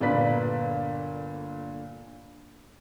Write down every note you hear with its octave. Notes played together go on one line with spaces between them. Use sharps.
G1 A#2 D3 B4 D5 B6